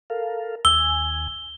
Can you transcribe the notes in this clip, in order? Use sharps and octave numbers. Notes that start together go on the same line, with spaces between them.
A4 A#4 F5
D#2 G#5 E6 G7